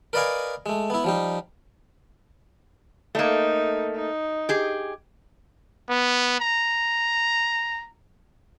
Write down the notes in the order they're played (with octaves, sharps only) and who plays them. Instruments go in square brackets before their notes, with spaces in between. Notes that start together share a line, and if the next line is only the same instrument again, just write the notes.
[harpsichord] A#4 B4 D5 D#5 F5 G#5
G#3 A3
B3 E4
F3 G3 D#4
[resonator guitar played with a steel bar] A3 A#3 [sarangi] D#4
[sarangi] D#4
[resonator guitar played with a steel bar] G4 G#4
[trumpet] B3
A#5